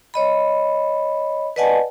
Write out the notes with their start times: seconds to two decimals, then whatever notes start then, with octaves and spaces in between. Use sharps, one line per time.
0.14 C#5 D#5 B5
1.56 B4 D5 D#5 F#5 G#5 A5